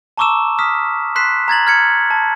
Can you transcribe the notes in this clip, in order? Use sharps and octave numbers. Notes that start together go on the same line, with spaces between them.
A5 A#5 C#6 D6 E6 E7
D#6 F6 B6
C6 F#6 B6 C7 E7
A#5 G#6 A6 F#7
F6 G#6 C#7
A5